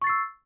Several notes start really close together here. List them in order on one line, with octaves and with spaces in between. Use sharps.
C#6 A6 C7 E6